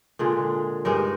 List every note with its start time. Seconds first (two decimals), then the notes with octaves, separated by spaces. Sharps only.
0.19 A#2 D3 G#3
0.85 G2 G#3 D#4 A#4